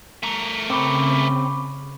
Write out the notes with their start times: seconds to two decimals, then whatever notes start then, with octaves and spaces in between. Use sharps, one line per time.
0.23 A3 A#4
0.70 C#3 C4 B5 C#6 D6